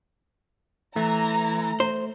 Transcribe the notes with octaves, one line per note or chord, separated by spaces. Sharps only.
E3 A3 A#5
C5